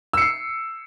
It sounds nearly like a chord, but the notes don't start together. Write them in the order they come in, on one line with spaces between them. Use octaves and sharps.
E6 C#7 C7